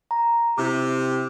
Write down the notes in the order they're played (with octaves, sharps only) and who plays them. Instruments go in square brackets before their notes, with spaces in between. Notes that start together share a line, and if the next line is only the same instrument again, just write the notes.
[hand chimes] A#5
[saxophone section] C3 G4 [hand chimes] E4 D6